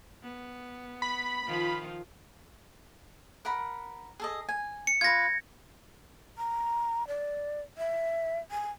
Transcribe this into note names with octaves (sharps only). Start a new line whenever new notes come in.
B3
B5
D#3 F3 F4
A#4 F#5 B5
G#4 A4 D#5
G#5
C#7
F4 B4 G#6 A#6
A#5
D5
E5
G#5